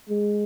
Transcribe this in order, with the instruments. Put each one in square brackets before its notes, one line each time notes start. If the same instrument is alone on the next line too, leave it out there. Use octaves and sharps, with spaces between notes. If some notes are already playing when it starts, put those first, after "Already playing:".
[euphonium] G#3